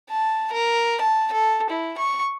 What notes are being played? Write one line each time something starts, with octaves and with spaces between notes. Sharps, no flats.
A5
A#4
A5
A4
E4
C#6